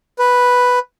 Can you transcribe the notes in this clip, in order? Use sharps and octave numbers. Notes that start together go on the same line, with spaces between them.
B4